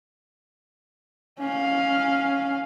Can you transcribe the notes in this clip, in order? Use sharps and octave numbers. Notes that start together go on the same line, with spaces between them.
C#4 F5